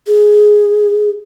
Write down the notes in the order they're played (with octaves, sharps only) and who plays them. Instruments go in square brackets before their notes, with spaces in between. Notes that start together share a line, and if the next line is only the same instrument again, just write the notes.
[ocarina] G#4